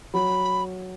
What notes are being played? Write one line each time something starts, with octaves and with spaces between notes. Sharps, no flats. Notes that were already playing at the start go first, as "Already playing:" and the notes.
F#3 B5